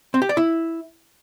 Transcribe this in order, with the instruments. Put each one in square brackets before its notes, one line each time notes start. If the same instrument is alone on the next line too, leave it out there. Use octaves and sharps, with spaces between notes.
[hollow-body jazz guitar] C4
G4
D5
E4